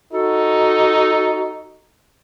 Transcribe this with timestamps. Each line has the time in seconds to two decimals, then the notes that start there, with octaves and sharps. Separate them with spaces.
0.13 D#4 F#4 A4